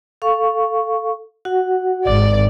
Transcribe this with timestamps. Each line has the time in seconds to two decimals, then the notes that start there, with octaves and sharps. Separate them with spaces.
0.22 A4 F5 C#6
1.45 F#4 F#5
2.05 G#1 D5